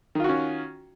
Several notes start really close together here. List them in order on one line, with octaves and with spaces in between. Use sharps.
D#3 F4 F#4 C#4